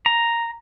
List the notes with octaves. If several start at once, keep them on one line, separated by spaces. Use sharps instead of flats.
A#5